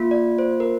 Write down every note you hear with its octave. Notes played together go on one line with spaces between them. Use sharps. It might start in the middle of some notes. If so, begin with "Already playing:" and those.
Already playing: A#3 F4
D5
C5
A#4